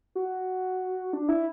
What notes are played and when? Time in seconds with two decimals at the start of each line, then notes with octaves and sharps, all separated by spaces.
0.15 F#4
1.13 D4
1.29 E4